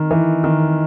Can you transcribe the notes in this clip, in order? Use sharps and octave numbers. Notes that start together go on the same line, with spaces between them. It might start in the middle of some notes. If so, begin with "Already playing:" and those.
Already playing: D#3
E3
D#3